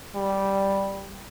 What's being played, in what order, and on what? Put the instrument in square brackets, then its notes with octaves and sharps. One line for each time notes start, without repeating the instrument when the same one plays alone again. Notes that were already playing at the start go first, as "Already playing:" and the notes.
[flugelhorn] G3